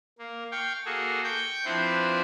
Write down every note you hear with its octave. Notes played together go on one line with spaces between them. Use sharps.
A#3
F5 G5 C#6
A#3 F#4 G#4 A4
G5 C#6 G6
F3 C4 D4 E4 B4 C5